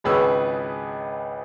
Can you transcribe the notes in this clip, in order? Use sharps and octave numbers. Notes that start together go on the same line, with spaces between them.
G#1 C#2 G#4 B4 C#5 E6